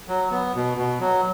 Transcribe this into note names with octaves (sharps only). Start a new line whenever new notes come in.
F#3
B3
B2
B2
F#3